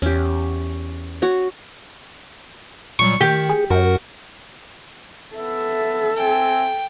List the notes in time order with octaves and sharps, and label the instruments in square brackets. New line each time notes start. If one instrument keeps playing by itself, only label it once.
[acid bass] E2 [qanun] C#4 G4
[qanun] F#4 C#5
[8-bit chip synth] A#2 F#3 G3 [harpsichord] C#6
[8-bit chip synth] D#3 [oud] G4
[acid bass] G#4
[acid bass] F#2 [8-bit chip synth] F#4 A#4 F#5
[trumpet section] B3 E5 [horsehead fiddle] A4
[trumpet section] C4 E5 G#5 [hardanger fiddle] G5